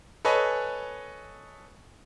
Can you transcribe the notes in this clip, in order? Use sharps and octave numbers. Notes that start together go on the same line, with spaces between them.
A4 B4 C#5 D#5 G#5